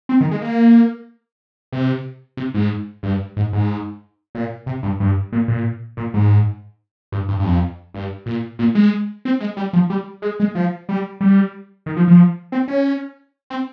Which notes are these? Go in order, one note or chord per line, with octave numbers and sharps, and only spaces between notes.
C4
D#3
G#3
A#3
C3
C3
G#2
G2
G#2
G#2
A#2
C3
G2
G2
A#2
A#2
A#2
G#2
G2
G2
G2
F2
G2
A#2
A#2
G#3
C4
G#3
G3
F3
G3
G#3
G#3
F3
G3
G3
D#3
F3
F3
C4
C#4
C4